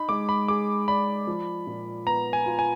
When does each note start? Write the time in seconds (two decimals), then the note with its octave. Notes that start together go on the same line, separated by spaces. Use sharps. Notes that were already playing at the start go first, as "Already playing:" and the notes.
Already playing: D#4 B5
0.09 G#3 D6
0.29 B5
0.48 G#4 D6
0.88 D5 B5
1.27 F3
1.67 A#2
2.07 B3 A#5
2.33 G#5
2.46 F4
2.59 G#5